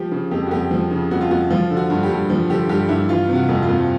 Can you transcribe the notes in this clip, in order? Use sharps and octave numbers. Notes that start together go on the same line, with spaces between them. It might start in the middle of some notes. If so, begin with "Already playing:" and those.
Already playing: F3 G4
C#3
F2 G4
F#4
F2 G4
F3
C#3
F2 F#4
F4
F2 F#4
F3 F4
D3
F#4
G2
G4
G2
F3
D3 G4
G2 G4
G2 E4
E3 F4
C3
F#4
F2
F4
F2